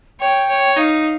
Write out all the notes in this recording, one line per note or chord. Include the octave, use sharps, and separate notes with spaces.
C#5 G5
C#5
D#4 F5